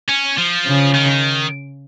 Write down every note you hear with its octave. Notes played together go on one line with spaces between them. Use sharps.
C#4
F3
C#3
D#3